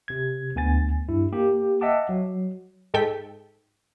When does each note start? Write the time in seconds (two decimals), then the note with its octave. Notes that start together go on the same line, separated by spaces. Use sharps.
0.08 C3 G#6
0.55 D2 B3 G#5 A6
1.08 G2 E4
1.32 A#3 G4
1.81 D#5 E5 F#5 G5 A5 D6
2.09 F#3
2.94 G#2 A4 G5 B6